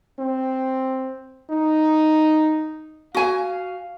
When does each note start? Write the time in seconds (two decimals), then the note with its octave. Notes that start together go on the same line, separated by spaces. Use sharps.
0.19 C4
1.50 D#4
3.15 F#4 F5 G#5